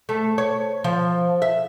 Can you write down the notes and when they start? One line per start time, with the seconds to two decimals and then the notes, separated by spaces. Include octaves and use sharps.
0.09 A3
0.38 C#5
0.84 F3
1.42 E5